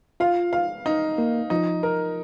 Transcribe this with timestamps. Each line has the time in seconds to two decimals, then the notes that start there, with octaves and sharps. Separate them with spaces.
0.20 F4 F5
0.53 F5
0.86 D#4
1.18 A#3
1.50 F3 D#4
1.83 A#4